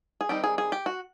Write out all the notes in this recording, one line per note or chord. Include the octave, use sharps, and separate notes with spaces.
G#4
D#3 G3 C4 D#4 G4
G#4
G#4
G4
F#4